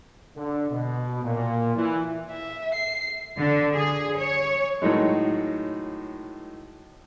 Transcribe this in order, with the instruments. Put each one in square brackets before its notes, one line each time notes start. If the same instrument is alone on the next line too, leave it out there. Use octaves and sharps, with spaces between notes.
[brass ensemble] D3
B2
A#2
E3
[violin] E5
C7
[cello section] D3
G#4
C#5
[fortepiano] A2 D#3 F#3 G#3